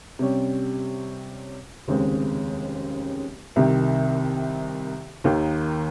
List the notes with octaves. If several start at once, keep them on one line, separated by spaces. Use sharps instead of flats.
C3 G3 C#4
F1 D#2 C#3 G#3 C4
C2 C3 D#3
D#2 D#3 A#3